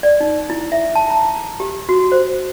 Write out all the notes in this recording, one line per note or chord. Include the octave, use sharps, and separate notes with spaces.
D5
D#4
E4
E5
A5
A#5
G4
F#4
C5